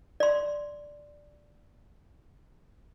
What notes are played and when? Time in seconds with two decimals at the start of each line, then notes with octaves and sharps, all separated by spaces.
0.20 D5 C6